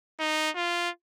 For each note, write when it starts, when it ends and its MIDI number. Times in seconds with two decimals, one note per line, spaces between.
0.20 0.50 63
0.55 0.90 65